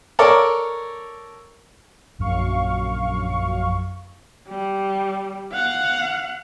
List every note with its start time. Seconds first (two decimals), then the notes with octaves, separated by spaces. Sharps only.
0.19 A4 A#4 C#5 D5
2.18 A#1 F#2 F5 C#6
4.49 G3
5.52 F5 F#5